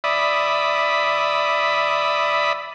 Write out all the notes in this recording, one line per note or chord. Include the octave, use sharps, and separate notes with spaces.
D5 E5 B5 D#6